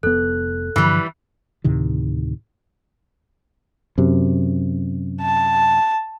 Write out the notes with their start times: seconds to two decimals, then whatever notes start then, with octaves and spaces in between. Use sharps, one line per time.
0.03 F1 B3 A4 F#6
0.76 G2 D3 E3 F3 G3 F#6
1.64 D2 A2 C3 D#3
3.98 F#2 C3
5.22 A5